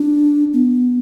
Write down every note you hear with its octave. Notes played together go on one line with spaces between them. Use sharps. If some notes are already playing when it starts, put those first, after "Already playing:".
Already playing: D4
B3